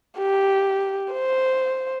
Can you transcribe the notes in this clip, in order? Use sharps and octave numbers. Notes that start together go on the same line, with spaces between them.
G4
C5